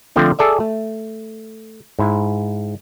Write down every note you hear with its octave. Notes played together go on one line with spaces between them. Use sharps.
D3 F3 A3 C4 D4
G#4 A4 D5 E5
A3
G#2 E4